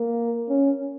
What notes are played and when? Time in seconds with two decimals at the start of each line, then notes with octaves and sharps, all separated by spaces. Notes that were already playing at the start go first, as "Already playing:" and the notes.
Already playing: A#3
0.49 C#4